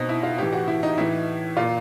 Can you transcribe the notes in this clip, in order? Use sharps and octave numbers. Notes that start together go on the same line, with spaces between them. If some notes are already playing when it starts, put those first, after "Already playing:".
Already playing: B2 C4 D#4
E4
F4
A2 E3 G4
F#4
E4
D#4
A2 E3 E4
A#2 F4